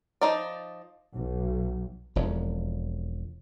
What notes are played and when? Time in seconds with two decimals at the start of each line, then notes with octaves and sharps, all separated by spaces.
0.21 F3 D#4 D5
1.15 B1
2.16 E1 F2